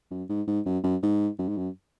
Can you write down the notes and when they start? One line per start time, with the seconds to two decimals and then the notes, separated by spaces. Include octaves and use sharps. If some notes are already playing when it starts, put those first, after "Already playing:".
0.11 F#2
0.29 G#2
0.47 G#2
0.66 F#2
0.83 F#2
1.03 G#2
1.39 F#2
1.48 G#2
1.57 F#2